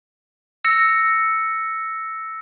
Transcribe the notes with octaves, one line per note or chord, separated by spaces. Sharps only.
E6 A#6 C#7